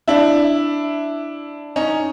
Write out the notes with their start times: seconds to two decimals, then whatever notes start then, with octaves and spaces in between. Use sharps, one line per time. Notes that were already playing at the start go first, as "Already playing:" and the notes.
0.08 D4 E4
1.76 C#4 D#4